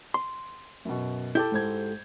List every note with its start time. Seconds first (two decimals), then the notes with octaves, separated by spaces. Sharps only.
0.14 C6
0.85 F#2 B2
1.35 E4 G4 A4 G6
1.52 G#2 C5 G#6